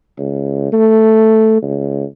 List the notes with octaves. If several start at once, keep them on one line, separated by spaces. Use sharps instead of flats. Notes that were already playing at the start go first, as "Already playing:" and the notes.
C#2
A3
C#2